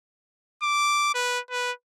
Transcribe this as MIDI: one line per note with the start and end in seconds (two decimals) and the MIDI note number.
0.62 1.12 86
1.14 1.39 71
1.50 1.72 71